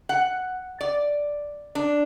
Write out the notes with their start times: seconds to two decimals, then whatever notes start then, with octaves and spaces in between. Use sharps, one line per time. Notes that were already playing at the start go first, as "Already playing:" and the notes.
0.09 F#5
0.81 D5
1.75 D4